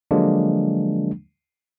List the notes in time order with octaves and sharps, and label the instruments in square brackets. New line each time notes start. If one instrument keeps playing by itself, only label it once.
[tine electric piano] D3 F3 F#3 G#3 A#3 D4